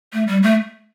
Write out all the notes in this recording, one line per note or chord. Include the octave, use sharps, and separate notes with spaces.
A3
G3
A3